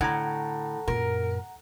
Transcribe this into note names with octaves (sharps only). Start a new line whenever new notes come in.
A2 D3 F#5 A#5
F#2 A#2 A#4